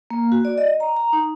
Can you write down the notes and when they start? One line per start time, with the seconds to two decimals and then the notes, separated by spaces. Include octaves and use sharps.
0.11 A#3
0.32 F#4
0.45 D5
0.58 D#5
0.80 A#5
0.97 A#5
1.13 D#4